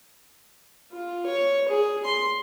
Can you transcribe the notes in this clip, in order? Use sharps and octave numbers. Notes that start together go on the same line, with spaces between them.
F4
C#5
G#4
C6